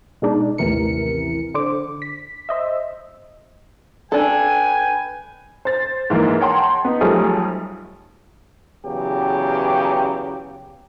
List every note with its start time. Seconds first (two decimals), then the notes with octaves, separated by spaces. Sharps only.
0.22 B2 G#3 D4 D#4
0.58 A1 D#2 C3 E3 A#4 C#7
1.54 D3 C5 D6
2.02 B6
2.49 C5 D#5 E5
4.12 D4 A4 B4 G5 G#5
5.65 C5 A6
6.10 G#2 E3 A#3 D#4
6.41 C#5 F#5 G5 A5 A#5 C6
6.85 B3 D#4
7.01 B1 F3 G3 A3 G#4 A#5
8.84 E2 C#3 F#3 G4